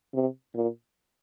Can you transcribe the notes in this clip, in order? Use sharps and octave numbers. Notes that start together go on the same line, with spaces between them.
C3
A#2